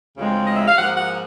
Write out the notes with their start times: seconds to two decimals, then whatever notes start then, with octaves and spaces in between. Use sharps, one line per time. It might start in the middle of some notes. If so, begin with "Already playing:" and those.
0.18 D2 C#3 F3 G#3 C4
0.46 D#5
0.56 E5
0.67 F5
0.77 G#2 F3 A#3 F#5
0.96 F#5